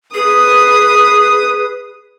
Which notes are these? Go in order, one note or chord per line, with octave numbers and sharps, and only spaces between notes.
G#4 B4 D#6